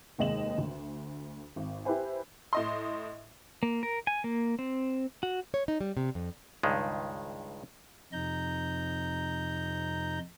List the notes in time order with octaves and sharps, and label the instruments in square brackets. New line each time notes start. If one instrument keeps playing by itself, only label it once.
[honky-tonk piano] F1 D#2 G#3 D#5 E7 F#7
D2
G#1
E4 G4 B4 C5 G#5
A2 D#5 C6
[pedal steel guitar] A#3
A#4
G#5
A#3
C4
F#4
[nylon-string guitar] C#5
D#4
G3
C3
F2
[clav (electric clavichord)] C#2 G2 D#3 G#3
[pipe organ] F2 C3 D#4 A#5 G6